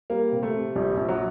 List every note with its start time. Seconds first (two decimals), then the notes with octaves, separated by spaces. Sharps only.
0.10 G3 A#3
0.32 C3
0.43 A3
0.54 C3
0.76 A#1 G3
0.97 A#1
1.08 F#3